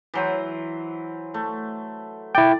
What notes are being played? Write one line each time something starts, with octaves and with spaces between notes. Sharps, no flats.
E3 F#3 C5
A3
E4 D5 G5